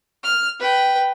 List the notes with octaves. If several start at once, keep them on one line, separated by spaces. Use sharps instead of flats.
F6
B4 G5